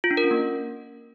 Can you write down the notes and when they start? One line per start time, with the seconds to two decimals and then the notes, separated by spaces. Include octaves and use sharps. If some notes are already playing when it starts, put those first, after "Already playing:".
0.04 F4
0.11 D4
0.17 A#4
0.24 C#4
0.31 A#3